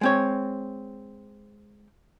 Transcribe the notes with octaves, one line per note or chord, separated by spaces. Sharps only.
G#3 C4 C#5